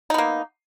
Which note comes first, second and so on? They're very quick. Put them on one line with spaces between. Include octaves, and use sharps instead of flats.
D#4 B3 A#3